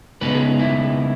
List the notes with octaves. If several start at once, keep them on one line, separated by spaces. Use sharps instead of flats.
C#3 G#3 B3 D#4 B4
G#4
E4